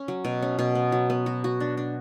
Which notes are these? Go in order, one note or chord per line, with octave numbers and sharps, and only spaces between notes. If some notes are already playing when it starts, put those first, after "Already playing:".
Already playing: C#4
F#3
B2
C#4
B2
B3
F#3
B3
F#4
F#4
D4
D4